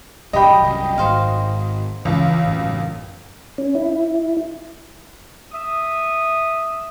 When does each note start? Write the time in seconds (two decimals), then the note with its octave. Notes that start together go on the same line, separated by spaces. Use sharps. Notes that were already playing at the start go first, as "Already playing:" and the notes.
0.33 B1 F#2 G4 D#5 G5 B5
0.62 C2 F#2
0.98 G#1 F#4 C5 F5
2.05 C#2 E3 F3
2.44 A1 F#2
3.58 C#4
3.75 E4
5.52 E5 D#6